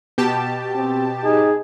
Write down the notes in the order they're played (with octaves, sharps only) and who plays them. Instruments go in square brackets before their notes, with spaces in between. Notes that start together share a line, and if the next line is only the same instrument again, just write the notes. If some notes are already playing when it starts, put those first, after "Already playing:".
[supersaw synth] B2 G4 A5
[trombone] C4
[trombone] D#4 [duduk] G#4